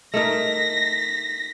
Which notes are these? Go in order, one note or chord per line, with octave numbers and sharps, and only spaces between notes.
A3 D#4 A#4 A#6 B6